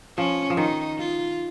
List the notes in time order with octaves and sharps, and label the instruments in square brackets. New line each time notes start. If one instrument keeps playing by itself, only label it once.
[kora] F3 [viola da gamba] C#4
[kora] F3
[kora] D#3 [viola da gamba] D#4
[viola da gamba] F4